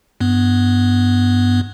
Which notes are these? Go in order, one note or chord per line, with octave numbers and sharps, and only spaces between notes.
G2 B3